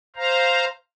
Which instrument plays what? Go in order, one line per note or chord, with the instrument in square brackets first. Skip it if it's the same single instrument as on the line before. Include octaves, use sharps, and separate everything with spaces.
[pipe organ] C5 F5 A#5